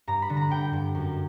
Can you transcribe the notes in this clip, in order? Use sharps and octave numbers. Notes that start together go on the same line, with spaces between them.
G2 A#5
B5
D3
A#5
G2 G5
G2
F#2